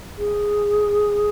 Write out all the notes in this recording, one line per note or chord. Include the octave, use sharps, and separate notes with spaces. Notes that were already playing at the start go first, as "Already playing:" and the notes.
G#4